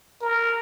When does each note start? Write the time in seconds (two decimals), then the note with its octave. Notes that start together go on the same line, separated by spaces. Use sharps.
0.22 A#4